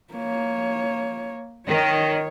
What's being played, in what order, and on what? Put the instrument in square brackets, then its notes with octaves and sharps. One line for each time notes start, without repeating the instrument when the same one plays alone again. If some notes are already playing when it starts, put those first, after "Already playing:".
[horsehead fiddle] A#3 C#5
[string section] D#3 [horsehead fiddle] C#5